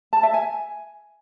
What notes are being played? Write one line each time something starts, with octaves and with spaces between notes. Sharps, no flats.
A5
E5
G#5